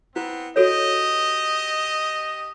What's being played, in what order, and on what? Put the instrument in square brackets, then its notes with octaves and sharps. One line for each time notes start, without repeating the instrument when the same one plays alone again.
[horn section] B3 C4 [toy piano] E4
[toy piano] F#4 A4 C#5 [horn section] G4 D#5